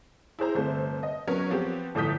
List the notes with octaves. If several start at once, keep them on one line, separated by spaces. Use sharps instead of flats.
E4 G#4 C5 A#5
G1 C3 A3 C5
D#5
F#3 B3 C#4 A#4 C#5
F3 B3 C4 G4
G1 A2 F3 D#6 G6 B6